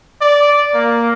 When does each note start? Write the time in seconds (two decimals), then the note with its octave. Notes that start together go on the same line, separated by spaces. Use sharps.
0.22 D5
0.74 A#3